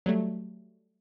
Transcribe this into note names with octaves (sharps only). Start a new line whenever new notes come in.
F#3 G3 A3